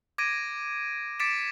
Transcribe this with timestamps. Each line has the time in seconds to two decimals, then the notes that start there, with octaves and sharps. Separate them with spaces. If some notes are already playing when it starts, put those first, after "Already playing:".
0.18 D6 G#6 A#6 D7 D#7
1.20 D6 A6 B6 C#7 D7 E7